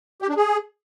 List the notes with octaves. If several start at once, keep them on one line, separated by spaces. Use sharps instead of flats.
G4
D4
G#4